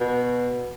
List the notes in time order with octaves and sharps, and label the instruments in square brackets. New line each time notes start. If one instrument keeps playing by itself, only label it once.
[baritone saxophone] B2